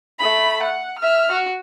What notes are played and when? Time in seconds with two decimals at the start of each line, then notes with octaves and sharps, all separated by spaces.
0.19 A3 B5
0.63 F#5
0.99 E5 F6
1.32 F#4